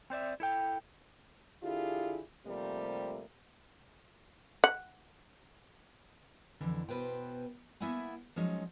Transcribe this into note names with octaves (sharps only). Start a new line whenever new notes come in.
C4 C5 D5 E5
E4 A4 G5
D3 E4 F4 G4 G#4
C3 F3 G3 A3 A#3
F#5
F2 D3 E3
B2 B4 C5 G5
A#3 B3 E4 E5 F#5 G#5
F3 F#3 G#3 C#4 D#4